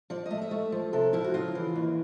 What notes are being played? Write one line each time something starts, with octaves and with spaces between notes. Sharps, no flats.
F3 D5
D#5
A3
E5
A3
F3
C3 A4
F3 E4
F#4
C#3 F4
E3
D#2